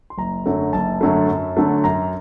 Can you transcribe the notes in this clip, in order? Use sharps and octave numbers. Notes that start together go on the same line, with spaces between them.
C6
F#1 A#5
F#2 D3 F#3 A3
F#1 A5
F#2 D3 F#3 A3
F#2
D3 F#3 A3
F#2 A#5